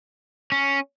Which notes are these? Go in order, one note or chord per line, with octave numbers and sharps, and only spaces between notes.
C#4